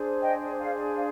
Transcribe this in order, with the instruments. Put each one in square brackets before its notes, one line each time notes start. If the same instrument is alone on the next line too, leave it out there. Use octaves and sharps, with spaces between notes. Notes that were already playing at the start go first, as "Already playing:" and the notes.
Already playing: [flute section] D4 G#4 C5
D#5 G5
D5 F5
F5